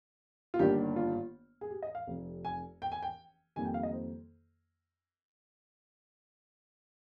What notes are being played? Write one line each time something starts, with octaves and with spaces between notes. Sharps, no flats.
F4
G1 G2 D#3 A#3 D4 G4
F4
G#4
G4
D#5
F5
F1 F2 C3
G#5
G5
G#5
G5
F2 D#3 G3 A#3 G#5
G5
F5
D#5
C5